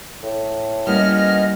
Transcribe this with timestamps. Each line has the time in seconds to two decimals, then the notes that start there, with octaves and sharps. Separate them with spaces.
0.23 A2
0.87 G3 A#3 B3 C#4 E4 D#5 F6